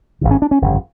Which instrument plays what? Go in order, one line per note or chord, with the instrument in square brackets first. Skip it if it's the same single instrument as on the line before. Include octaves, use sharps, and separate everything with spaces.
[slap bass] G#1 G2 D3
C#4
D4
C#4
G1 F2 C#3